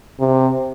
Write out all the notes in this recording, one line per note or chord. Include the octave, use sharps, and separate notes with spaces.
C3